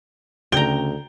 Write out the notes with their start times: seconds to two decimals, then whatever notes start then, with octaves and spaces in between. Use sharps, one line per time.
0.52 D2 C#3 G5 A#5 G7